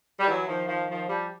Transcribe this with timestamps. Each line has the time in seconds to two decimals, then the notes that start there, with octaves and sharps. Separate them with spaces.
0.20 G3
0.28 E3 F#3
0.47 D#3 F3
0.68 D#3 F3
0.89 D#3 F3
1.09 F3 G3